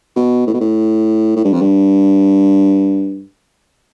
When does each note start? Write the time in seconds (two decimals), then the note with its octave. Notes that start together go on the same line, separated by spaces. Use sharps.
0.16 B2
0.47 A2
0.54 B2
0.60 A2
1.36 A2
1.44 G2
1.53 F2
1.61 G2